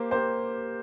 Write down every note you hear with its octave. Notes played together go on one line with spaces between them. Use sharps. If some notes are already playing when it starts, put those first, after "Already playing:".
Already playing: A#3 G4 C5
A#3 G4 C5